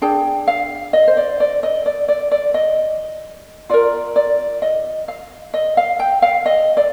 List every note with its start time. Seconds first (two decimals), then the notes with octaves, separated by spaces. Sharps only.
0.02 D4 G#4 G5
0.47 F5
0.93 D#5
1.08 C5
1.17 D5
1.40 D5
1.63 D#5
1.86 D5
2.08 D5
2.31 D5
2.54 D#5
3.69 F4 A#4 D5
4.16 D5
4.62 D#5
5.08 F5
5.54 D#5
5.77 F5
5.99 G5
6.22 F5
6.46 D#5
6.77 D5